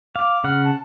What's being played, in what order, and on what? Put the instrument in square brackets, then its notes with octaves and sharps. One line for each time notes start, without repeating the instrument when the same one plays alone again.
[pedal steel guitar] F5 [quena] D6
[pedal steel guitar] C#3 F#5 [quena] F6
[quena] A5